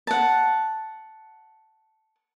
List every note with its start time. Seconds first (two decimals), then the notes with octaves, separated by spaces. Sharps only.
0.07 F#5 A5